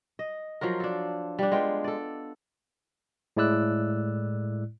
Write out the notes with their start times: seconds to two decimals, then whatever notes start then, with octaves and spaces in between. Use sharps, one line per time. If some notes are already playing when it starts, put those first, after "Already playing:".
0.19 D#5
0.61 F3 F#3 F4 A#4
0.80 D4 A4
1.39 G3 D4
1.52 G#3 B3 F4 G5
1.84 A4 D5
3.37 A2 G#3 E4 D5 E6 F#6